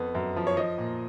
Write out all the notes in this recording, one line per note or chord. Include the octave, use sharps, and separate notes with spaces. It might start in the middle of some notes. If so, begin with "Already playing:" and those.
Already playing: F2 B3
F#2
F3
C#5
F3 D#5
A#2